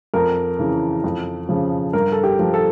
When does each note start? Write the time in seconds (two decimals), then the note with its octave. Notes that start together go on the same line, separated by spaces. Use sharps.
0.14 F2 A#4
0.59 C#3 E3
1.04 F2
1.49 C#3 F3
1.93 G2 A#4
2.12 A4
2.24 G4
2.39 F3
2.54 A4